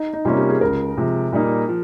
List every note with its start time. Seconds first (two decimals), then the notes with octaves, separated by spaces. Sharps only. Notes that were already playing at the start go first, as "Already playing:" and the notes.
Already playing: D#4
0.13 D#4
0.25 C3 G3 A#3 C#4 F4
0.37 G4
0.50 G#4
0.61 C#2 C#3 G#3 A#4
0.97 C3 F3 G#3
1.32 A#2 G3 A#3 D#4
1.68 F3